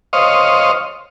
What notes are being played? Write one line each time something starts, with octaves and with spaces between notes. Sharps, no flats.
C5 C#5 D#5 F5